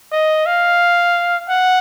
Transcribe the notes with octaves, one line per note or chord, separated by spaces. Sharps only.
D#5
F5
F#5